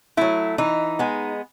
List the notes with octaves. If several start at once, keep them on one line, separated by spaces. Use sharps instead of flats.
F#3 A3 E4
E3 D#4
G#3 B3